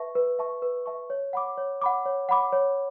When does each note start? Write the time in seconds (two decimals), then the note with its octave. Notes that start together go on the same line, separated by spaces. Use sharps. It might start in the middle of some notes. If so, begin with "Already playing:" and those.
Already playing: B4 E5 A5 C#6
0.15 B4
0.39 E5 A5 C#6
0.62 B4
0.86 E5 A5 C#6
1.10 C#5
1.33 F#5 B5 D6
1.58 C#5
1.82 F#5 B5 D6
2.06 C#5
2.29 F#5 B5 D6
2.53 C#5